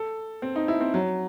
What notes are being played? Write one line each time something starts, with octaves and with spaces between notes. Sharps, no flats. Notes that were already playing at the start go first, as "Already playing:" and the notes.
Already playing: A4
C4
D#4
E4
C4
F#3